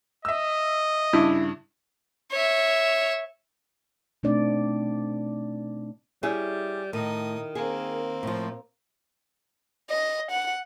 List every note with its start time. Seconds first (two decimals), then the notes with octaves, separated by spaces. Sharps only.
0.25 D#5 E5 E6
1.13 G2 C#3 D4 E4
2.31 C#5 E5
4.23 B2 A3 C4 D4 D#4 D5
6.23 G3 C#4 E4 G#4
6.93 A2 D#3 D#4 D#6
7.55 A#3 C4 G#4
8.23 A2 F3
9.90 D#5
10.31 F#5